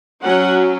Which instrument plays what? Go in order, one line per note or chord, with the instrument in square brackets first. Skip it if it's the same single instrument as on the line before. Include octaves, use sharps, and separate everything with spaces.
[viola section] F#3 C#4 F#5